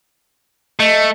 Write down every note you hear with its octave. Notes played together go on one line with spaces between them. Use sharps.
A3 D#5